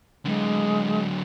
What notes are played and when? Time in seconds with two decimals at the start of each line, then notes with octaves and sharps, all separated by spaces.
0.25 D3 F#3 G#3